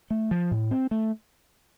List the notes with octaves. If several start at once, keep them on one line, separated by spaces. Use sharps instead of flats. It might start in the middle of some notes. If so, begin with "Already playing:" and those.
A3
F3
A2
C4
A3